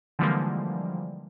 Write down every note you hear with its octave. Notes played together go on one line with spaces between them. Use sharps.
D3 E3 F3 G3 G#3 A#3